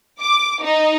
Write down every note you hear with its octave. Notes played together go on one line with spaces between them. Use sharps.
D6
D#4